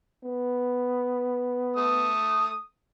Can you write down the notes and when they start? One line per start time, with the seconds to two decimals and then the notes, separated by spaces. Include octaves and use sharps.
0.24 B3
1.76 A3 D#6